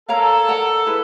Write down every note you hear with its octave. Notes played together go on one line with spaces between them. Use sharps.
A4 A#4 C#5 F5 A#5
A#4 D5 F#5 A#5
E4 G#4 B4